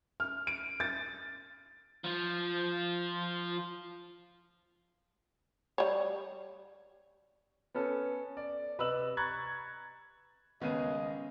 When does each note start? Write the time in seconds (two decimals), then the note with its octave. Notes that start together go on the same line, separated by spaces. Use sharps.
0.20 F6
0.47 D7
0.80 A6
2.04 F3 F4
5.78 G3 C#5
7.74 B3 C#4 A4
8.37 D5
8.78 C3 B4 D#5 E6 F#7
9.17 A#5 B5 C#6 F#6 G#6 A6
10.62 D#2 C#3 G#3 B3 C#4 D#5 F#5 D#7